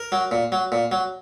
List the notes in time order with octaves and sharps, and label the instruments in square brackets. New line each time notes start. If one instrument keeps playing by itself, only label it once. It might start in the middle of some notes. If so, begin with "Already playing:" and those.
Already playing: [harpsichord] A#4
F#3
A#2
F#3
A#2
F#3